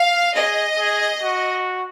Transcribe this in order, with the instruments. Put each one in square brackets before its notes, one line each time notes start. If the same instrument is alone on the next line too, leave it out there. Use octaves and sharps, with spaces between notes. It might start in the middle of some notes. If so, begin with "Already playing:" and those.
Already playing: [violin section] F5
[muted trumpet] G#4 [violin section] D#5
[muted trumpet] G#4
F#4